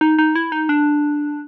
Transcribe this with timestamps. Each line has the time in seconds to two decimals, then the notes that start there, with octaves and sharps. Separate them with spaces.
0.01 D#4
0.19 D#4
0.36 E4
0.52 D#4
0.69 D4